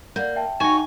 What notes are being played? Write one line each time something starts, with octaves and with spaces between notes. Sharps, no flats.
A#3 D5 F#5 G6
E5 G5 A5
D#4 F#4 C#5 G#5